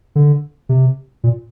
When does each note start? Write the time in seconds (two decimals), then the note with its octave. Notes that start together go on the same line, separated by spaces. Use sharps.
0.15 D3
0.69 C3
1.24 A#2